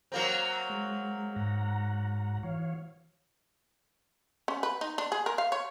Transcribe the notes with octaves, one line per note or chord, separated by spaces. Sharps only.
F#3 A#3 C4 A#5
G#3
G#2 F#5 A#5
E3 C#5 F5
C#4
B4
D#4
D4
G#4
A#4
F5
C#5